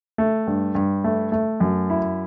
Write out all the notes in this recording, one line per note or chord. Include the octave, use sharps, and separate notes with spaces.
A3
G2
G2
A3
A3
F#2
E4